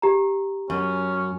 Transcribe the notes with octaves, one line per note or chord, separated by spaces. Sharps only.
G4 A#5
F#2 C#4